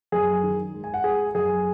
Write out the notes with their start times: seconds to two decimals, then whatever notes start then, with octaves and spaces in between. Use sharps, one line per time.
0.12 F#2 G#4 G#5
0.43 D#3
0.74 G#3
0.84 G#5
0.94 F#5
1.04 G#3 G#4 G#5
1.35 F#2 G#4 G#5